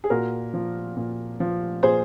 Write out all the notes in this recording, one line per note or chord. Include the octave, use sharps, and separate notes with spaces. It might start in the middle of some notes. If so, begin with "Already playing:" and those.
G#4
A#2 F#4 A#4
F3
A#2
F3
A#2 G#4 C5